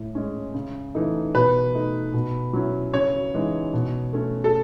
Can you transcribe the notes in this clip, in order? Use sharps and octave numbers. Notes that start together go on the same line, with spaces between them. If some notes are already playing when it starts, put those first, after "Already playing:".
Already playing: A2
G#3 C#4
C#3
E3 A3 D#4
B2 B4
A3 D#4
B2
F#3 C#4 E4
C#3 C#5
E3 G#3 D#4
B2
A3 C#4
A4